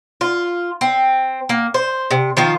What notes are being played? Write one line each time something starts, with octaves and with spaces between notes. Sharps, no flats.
F4
C4
A#3
C5
C3
D#3 F3 F4